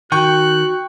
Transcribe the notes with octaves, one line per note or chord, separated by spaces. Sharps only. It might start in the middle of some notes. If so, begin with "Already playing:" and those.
D#3 F#4 G5 C#6 F#6 G6